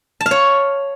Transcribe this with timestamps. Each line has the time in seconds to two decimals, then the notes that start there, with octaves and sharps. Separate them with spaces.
0.21 A5
0.26 F5
0.31 C#5